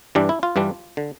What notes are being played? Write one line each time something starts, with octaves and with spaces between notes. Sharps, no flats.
G2 E3 G3 D4
E4
F4
G2 E3 G3 D4
D3